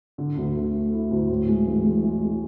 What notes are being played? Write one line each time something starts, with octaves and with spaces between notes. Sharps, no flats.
D3
D2
A3
A3
E4
D2
A2
G#3
A1
G#3
G#3
G#3